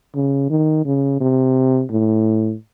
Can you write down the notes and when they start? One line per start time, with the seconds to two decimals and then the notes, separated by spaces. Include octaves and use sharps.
0.15 C#3
0.50 D#3
0.85 C#3
1.21 C3
1.91 A2